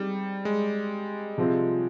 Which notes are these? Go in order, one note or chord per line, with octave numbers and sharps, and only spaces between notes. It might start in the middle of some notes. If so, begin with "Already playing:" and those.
Already playing: G3 G#3 C4 D#4 G4
G#3
C3 F3 G#3 C4 F4